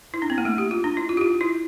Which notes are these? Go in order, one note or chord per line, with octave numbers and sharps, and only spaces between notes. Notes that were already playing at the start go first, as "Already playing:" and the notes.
E4
D4
C4
A#3
A3
G4
F4
D4
E4
F4
G4
F4
E4